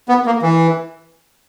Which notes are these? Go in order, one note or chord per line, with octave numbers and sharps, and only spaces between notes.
B3
A#3
E3